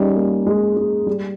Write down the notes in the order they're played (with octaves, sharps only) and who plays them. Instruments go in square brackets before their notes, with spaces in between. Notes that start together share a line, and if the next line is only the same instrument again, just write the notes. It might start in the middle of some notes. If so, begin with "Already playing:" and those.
Already playing: [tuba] G3 [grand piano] C#4 D#4 G#4
[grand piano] A#3
G#3
G#3
G3